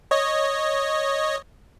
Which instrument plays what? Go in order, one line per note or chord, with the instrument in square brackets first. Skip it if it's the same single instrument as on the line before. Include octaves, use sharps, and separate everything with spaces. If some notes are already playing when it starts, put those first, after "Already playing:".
[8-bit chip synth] C#5 D#5